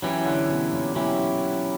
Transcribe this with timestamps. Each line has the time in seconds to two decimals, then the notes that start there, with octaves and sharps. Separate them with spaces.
0.02 E3 F#3 C#4 E4 G4
0.26 D3
0.49 B2
0.73 A#2
0.95 B2 F#3 C#4 E4 G4